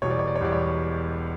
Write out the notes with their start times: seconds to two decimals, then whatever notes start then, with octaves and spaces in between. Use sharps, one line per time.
0.02 E1 E2 B2 G3 C#5
0.10 D5
0.19 C#5
0.27 D5
0.36 C#5
0.40 E1 E2 B2 G3 D5
0.53 C#5